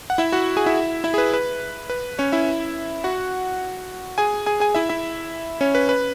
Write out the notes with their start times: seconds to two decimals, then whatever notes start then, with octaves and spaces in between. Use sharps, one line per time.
0.10 F#5
0.18 E4 E5
0.32 F#4 F#5
0.57 G#4 G#5
0.66 E4 E5
1.04 E4 E5
1.14 G#4
1.18 B4
1.33 B4
1.90 B4
2.19 C#4 C#5
2.32 E4 E5
3.04 F#4 F#5
4.18 G#4 G#5
4.46 G#4 G#5
4.60 G#4 G#5
4.75 E4 E5
4.89 E4 E5
5.61 C#4 C#5
5.75 B4
5.89 B4